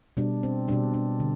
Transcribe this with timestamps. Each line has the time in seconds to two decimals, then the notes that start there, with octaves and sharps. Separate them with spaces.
0.17 B2 G3 D4
0.43 C4
0.68 G3 D4
0.72 B2
0.94 D4
1.20 D3